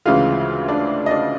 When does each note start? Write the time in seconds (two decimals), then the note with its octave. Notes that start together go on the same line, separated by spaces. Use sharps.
0.06 D2 C#3 E3 G#3 F4 F5
0.68 D4 D5
1.06 D#5
1.11 D4 D5